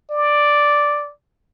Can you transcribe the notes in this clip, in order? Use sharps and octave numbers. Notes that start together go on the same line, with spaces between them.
D5